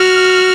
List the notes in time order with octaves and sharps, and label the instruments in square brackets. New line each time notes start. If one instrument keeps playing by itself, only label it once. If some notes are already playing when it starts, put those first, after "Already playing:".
Already playing: [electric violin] F#4 [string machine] F6
[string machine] F6